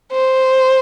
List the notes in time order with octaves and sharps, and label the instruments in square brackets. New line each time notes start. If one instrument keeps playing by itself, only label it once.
[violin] C5